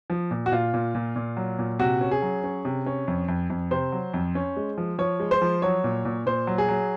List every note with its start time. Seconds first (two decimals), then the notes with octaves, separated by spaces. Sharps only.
0.10 F3
0.31 A#2
0.46 F#4
0.52 A#2 F4
0.74 A#2
0.95 A#2
1.16 A#2
1.37 F#3
1.59 A#2
1.79 C3 F#4
2.01 C#4
2.11 G#4
2.22 F#3
2.44 C#4
2.65 C3
2.86 C#4
3.08 F2
3.28 F2
3.50 F2
3.71 C3 C5
3.92 F#3
4.14 F2
4.35 C#4
4.57 G#3
4.78 F3
4.98 F3 C#5
5.20 G#3
5.31 C5
5.41 F3
5.62 F#3 C#5
5.84 A#2
6.05 A#2
6.26 A#2 C5
6.47 F#3
6.58 G#4
6.69 F#3